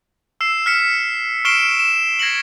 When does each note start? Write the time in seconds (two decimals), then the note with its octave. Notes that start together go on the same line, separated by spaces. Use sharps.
0.41 E6 C7 E7
0.66 F6 B6 C#7 E7
1.45 C#6 F6 C7 D7 E7 G7
1.79 E7
2.19 G#6 A#6 C7 C#7 F#7